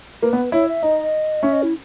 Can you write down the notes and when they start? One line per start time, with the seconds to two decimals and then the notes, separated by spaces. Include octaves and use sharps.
0.22 A#3 B4
0.33 B3
0.52 E4 C#5
0.68 E5
0.83 D#4 D#5
1.42 C#4 E5
1.53 D#5
1.63 E4